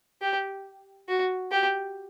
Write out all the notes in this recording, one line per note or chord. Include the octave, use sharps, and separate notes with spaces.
G4
F#4
G4